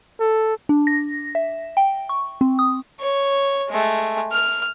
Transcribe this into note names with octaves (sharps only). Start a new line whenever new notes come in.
A4
D4
A#6
E5
G5
C#6
C4
D#6
C#5
G#3 A3
F6